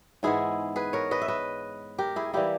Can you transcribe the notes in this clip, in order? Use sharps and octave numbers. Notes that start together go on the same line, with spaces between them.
G#2 E3 G#3 B3 E4 G#4
G#4 B4
A#4 C#5
B4 D#5
E5
B4 D#5
G4 A#4
E4 G#4
E3 G3 A#3 E4 G4